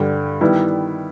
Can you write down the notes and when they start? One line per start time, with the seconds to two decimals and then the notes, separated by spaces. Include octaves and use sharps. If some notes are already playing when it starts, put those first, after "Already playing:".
Already playing: G2 D3 G3
0.41 D#3 G3 B3 E4